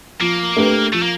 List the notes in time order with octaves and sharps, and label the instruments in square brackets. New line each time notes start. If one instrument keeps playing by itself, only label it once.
[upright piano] F3 [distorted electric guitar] A#3
[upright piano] A3 D4 G4 B4
[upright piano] F3 [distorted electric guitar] A3
[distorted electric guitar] A#3